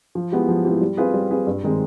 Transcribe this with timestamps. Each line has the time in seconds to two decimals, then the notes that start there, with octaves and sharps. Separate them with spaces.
0.15 F3
0.32 G#3 B3 E4 G4
0.49 F3
0.65 G#3 B3 E4 G4
0.81 G3
0.97 C4 F4 G#4 B4
1.14 G3
1.30 C4 F4 G#4 B4
1.47 G2
1.64 D#3 G#3 C4